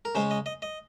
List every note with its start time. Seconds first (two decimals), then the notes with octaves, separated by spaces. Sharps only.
0.05 A#4
0.15 C#3 G#3 C5
0.31 D#5
0.46 D#5
0.62 D#5